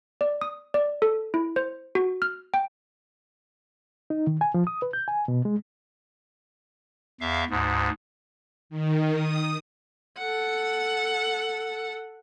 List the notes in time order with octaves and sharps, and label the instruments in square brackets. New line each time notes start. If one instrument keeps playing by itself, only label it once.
[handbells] D5
D#6
D5
A4
E4
C5
F#4
F6
G5
[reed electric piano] D#4
D#3
G#5
F3
D#6
B4
G6
G#5
B2
G#3
[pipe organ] E2 E5 F5
D2 G#2
[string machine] D#3
D#6
[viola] A4 F#5